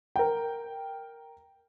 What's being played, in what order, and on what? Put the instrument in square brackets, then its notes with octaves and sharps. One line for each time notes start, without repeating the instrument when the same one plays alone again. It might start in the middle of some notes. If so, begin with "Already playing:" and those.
[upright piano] A#4 G5